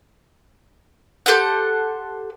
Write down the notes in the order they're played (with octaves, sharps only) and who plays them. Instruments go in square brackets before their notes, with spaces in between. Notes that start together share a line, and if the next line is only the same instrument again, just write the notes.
[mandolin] G4 A4 C5 F#5